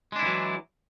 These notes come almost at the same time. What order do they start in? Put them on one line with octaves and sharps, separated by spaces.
G#3 D4 E4 E3 F#3